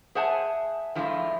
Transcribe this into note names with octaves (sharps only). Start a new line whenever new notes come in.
G#4 C5 E5 F#5 G#5 A5
G2 F3 G#3 A3 E4 F4